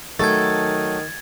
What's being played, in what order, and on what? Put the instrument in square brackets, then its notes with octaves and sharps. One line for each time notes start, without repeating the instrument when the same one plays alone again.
[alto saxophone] D#3 [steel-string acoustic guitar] F#3 A4 [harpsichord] A3 [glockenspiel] G#6 A6